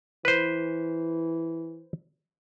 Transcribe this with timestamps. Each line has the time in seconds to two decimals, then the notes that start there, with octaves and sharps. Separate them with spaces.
0.25 E3 B4 C5